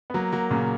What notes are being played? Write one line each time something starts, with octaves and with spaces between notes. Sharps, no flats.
B3
F#3 A#3
F#3 A#3
A#2 C#3